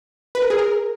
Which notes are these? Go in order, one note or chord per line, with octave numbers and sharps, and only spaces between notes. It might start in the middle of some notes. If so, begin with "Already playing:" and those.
B4
A#4
G#4
A#4